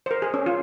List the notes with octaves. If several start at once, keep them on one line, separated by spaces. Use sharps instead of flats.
C5
A#4
G#4
C#4
F4